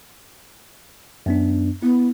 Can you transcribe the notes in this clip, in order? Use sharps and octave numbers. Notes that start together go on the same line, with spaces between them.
F#2 B3 D4
B3 E4